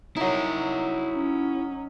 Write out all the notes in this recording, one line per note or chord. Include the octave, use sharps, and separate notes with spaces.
F#3 D#4 E4 A#4
C#4